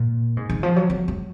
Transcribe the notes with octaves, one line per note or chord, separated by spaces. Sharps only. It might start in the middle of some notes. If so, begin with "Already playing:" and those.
Already playing: A#2
G#2
D#3
F3
F#3
F#3
F#3